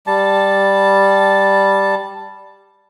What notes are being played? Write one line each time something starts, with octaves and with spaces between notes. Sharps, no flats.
G3 A5